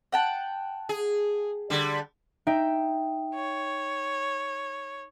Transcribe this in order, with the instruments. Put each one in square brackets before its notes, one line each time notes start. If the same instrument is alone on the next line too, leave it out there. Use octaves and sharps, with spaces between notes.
[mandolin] F#5 G5 A5
[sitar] G#4
D3 G3
[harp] D#4 E5 G5
[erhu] C#5